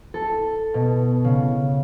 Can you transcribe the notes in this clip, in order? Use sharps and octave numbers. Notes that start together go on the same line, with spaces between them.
A4
B2
C#3